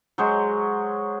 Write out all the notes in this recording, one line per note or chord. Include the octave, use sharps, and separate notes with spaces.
F#3 G#3 C5